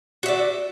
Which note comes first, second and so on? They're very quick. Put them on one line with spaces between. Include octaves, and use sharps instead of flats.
F#4 E5 D5